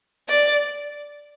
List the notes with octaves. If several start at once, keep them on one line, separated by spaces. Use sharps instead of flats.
D5